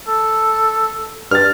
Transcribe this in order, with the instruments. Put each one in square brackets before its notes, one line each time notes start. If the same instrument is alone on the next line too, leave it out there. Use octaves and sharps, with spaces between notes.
[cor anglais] A4
[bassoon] G2 [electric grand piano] F6 A6